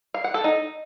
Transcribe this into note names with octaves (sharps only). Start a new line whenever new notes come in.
F5
F#5
A4
D#4